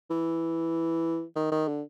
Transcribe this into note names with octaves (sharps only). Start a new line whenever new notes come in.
E3
D#3
D#3
D3